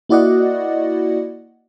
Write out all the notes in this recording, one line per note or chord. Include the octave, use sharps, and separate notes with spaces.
A#3 E4 F#4 D5 D#5 F#5